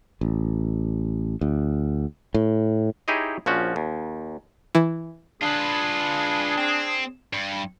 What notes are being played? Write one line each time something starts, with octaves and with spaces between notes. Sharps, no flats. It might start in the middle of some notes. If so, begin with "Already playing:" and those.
A1
D2
A2
D#4 E4 G4 G#4 C#5 D#5
A#1 F3 C#4 F#4
D#2
E3
D4 F4 G#4 B4
C4
G2